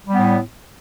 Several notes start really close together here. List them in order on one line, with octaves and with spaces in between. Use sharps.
G3 B3 A2